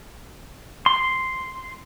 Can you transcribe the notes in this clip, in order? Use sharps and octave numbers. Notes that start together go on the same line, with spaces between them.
C6